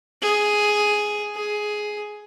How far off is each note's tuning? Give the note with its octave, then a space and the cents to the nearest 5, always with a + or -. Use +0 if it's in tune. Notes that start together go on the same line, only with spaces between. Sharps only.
G#4 +5
G#4 +10